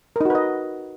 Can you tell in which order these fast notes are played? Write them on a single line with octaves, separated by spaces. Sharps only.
A#4 D#4 F#4 B4 D#5